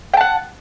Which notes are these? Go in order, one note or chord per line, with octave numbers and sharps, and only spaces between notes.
F#5 G5 A5